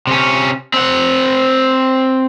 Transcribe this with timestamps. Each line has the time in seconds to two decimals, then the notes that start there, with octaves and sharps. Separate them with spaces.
0.07 C3 C#4
0.74 C4 F#5